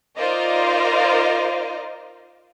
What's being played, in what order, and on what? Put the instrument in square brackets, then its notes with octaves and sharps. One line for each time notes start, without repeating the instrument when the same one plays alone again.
[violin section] D#4 F4 A#4 C5 D5 D#5